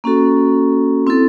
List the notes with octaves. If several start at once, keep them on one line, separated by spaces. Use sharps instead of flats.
A#3 C#4 F#4 A4
C4 E4 A4